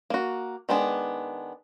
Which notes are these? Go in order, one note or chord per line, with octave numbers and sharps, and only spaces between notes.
A#3 F#4
D#3 G#3 B3 D4